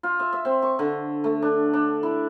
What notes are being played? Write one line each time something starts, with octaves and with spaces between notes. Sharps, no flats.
F4
E5
E5
C4
C#6
D3
A3
D4
D4
E4